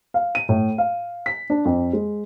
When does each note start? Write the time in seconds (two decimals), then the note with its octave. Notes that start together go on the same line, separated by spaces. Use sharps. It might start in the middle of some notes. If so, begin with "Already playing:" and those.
0.14 F5
0.35 D#7
0.49 A2
0.78 F5
1.26 B6
1.50 D4
1.65 F2
1.93 G#3